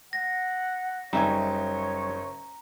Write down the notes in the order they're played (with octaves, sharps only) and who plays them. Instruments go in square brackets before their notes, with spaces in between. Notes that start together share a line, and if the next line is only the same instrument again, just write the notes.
[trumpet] F#5 [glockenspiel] A#6
[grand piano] F#1 D#4 [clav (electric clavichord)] G3 E5 G#5 [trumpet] C#5 [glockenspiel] A#5